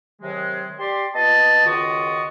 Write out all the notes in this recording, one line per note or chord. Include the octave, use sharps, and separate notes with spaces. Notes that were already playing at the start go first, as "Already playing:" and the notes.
C3 D#3 F#3 G#3
G4 D5 C6
B3 F4 D#5 A5
C#2 D#3 F4 F#4 D#5